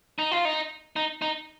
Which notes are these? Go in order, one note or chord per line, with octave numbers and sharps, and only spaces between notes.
D#4
F4
D#4
D#4
D#4